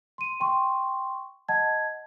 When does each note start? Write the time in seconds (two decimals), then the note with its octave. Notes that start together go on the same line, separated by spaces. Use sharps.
0.18 C6 D#7
0.40 G5 C6 C#6
1.49 D#5 F#5 A5 G#6